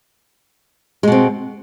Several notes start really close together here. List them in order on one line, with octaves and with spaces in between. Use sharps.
G#3 B2 C4